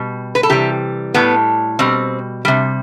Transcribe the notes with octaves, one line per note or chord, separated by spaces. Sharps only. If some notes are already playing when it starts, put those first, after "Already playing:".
Already playing: B2 G3
B4
A4
C3 E3 G3 G4
A2 G3 B3
B2 G3 C4
C3 G3